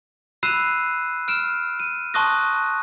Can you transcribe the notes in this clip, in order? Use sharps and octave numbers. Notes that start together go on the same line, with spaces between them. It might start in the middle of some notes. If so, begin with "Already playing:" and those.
B5 E6 F#6 C7 D#7 E7
F6 D7 E7
D#7
A5 C6 C#6 D#6 F#6 A#6